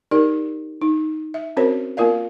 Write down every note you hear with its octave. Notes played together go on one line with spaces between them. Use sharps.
D#4 G4 A#4 D5
D#4
E5
C4 C#4 F#4 A#4 C5 C#5
A#3 B3 F4 A#4 D5 F5